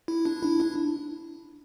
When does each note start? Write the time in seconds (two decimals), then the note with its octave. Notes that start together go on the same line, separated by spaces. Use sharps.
0.08 E4
0.26 D4
0.43 E4
0.60 D4